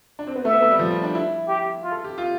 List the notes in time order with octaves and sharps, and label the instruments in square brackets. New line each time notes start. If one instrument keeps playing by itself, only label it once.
[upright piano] D4
C4
B3
[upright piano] A3 [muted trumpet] E5
[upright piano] B3
A3
G3
F3
G3
D4
E4
[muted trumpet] G4
F4
[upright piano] A4
G4
F4